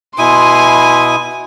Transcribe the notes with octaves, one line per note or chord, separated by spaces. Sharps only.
B2 E4 G#5 C6 D#6